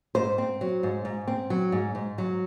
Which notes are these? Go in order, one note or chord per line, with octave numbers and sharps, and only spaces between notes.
G#2 C5
C4
F#3
G#2
G#2
C4
F#3
G#2
G#2
F#3